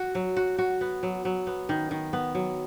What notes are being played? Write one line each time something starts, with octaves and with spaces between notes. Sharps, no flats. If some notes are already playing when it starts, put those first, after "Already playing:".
Already playing: F#4
F#3
F#4
F#4
B3
F#3
F#3
B3
D#3
D#3
B3
F#3